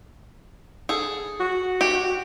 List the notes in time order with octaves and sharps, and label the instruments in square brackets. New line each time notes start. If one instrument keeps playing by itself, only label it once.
[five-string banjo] G#4 A4
[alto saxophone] F#4
[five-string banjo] G4